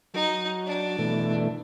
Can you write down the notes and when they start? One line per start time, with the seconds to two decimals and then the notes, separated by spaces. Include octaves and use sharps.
0.14 F#3 D#4
0.66 D4
0.99 B2 E3 A3